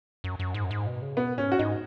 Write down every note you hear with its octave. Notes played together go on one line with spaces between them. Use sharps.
F#2
F#2
G#2
F#2
G#2
B2
C#3
B2 B3
G#2 C#4
F#4
G#2 D#4